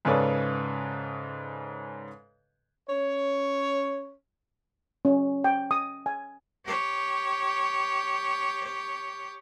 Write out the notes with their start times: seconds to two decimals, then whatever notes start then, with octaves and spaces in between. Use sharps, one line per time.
0.05 G#2 C#3 A4 B4 C#5 D5
2.90 C#4 C#5
5.05 C#4
5.44 G5
5.71 D#6
6.06 G#5
6.65 G4 C#5